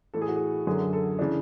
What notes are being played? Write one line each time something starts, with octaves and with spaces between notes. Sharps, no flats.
A2 E3 A4
G#4
F#4
G#4
F#2 D3 F#3 G#4
A4
C#3 E3 D4